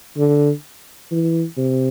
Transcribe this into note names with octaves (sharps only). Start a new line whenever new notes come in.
D3
E3
C3